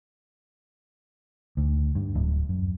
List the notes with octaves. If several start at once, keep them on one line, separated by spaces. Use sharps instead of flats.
D2
G2
D1
F#2